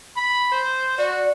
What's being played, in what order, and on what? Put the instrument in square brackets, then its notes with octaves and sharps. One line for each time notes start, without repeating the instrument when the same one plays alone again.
[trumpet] B5
C5
[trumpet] F#4 [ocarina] D5